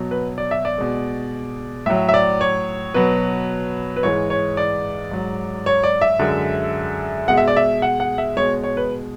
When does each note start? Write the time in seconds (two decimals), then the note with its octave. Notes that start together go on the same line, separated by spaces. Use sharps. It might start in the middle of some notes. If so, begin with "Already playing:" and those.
Already playing: B2 F#3
0.11 B4
0.38 D5
0.51 E5
0.65 D5
0.78 B2 G#3
1.86 A2 F#3 E5
2.09 E5
2.14 D5
2.41 C#5
2.94 B2 F#3 B4
3.96 B4
4.03 G#2 E3 G#3 C#5
4.30 C#5
4.57 D5
5.11 G#2 F#3
5.66 C#5
5.84 D5
6.01 E5
6.19 F#2 D3 G#3
7.28 B2 G#3 F#5
7.37 E5
7.48 D5
7.56 E5
7.82 F#5
8.00 F#5
8.18 E5
8.37 B2 G#3 C#5
8.64 C#5
8.77 B4